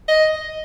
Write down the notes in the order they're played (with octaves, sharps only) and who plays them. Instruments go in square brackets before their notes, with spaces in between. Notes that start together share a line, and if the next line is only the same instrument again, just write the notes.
[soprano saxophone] D#5